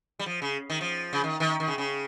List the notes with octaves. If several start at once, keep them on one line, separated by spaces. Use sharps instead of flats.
G3
F3
C#3
D#3
F3
C#3
D#3
D#3
D#3
C#3
C#3